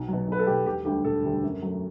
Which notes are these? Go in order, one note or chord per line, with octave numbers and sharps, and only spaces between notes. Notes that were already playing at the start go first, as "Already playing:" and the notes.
Already playing: B1
B2 F#3
B1 B4
A4
B2 F#3 G4
E1 G4
D2 D3 G3 G4
E1 A4
D2 D3 G3
F#2
F#3 A3